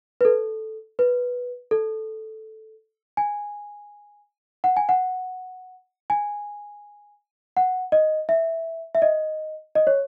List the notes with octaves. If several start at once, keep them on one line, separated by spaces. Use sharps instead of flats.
B4
A4
B4
A4
G#5
F#5
G#5
F#5
G#5
F#5
D#5
E5
E5
D#5
D#5
C#5